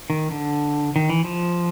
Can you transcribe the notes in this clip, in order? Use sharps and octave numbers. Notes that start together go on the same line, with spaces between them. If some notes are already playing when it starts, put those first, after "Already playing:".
D#3
D3
D#3
E3
F3